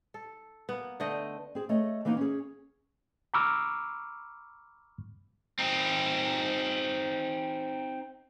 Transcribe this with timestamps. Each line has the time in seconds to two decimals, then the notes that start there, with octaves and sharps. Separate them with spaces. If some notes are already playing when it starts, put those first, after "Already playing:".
0.14 A4
0.69 A#3 B3
1.00 D3 A3 D#5 G5
1.55 C4 G#4
1.69 A3 C#5 D#5
2.05 E3 A#3 B3 D#4
2.17 C#4 G#4
3.34 A#5 B5 C#6 D6 E6 F6
5.59 C4 D#4